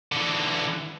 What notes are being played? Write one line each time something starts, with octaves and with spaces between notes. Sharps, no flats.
D3 E3